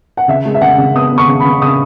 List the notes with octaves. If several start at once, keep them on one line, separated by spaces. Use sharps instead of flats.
F#5
C#3 E5
G#3
E5
C#3 F#5
C#3
B3 D#6
B3
C#6
C#3
C#3 B5
C#3 D#6